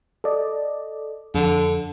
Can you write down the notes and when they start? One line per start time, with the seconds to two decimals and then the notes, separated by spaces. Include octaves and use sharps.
0.24 A4 D5 D#5
1.35 F2 D3